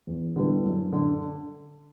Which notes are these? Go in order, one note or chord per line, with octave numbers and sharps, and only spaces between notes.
E2
D3 G3 B3 E4
F#2
D3